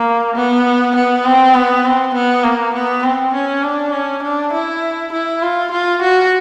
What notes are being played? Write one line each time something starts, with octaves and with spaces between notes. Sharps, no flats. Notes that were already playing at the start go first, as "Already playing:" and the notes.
Already playing: A#3
B3
B3
C4
B3
C4
B3
A#3
B3
C4
C#4
D4
C#4
D4
E4
E4
F4
F4
F#4